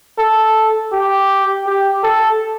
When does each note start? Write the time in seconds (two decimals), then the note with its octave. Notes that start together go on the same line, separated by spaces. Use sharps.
0.18 A4
0.93 G4
1.66 G4
2.04 A4